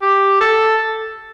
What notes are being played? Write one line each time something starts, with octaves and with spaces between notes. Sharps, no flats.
G4
A4